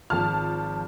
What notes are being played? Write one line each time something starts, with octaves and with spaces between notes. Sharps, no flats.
G#1 F3 A5 F6